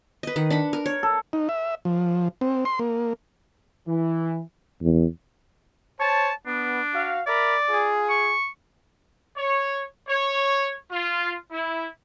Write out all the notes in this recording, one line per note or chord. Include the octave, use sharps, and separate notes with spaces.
B4 D#5
D#3 F#5
D4 F#5 B5
A#4
C#5
A4
D#4
E5
F3
C4
C6
A#3
E3
E2
C5 C#5 A5
B3 D4
F#4 F5
A#4 D5 E5 B5
F4 G#4
C#6
C#5
C#5
F4
E4